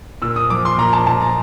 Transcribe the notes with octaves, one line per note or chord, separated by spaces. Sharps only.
A#2 E6
D#6
F3 D6
C6
A#2 A#5
A5
A#2 A5
A#5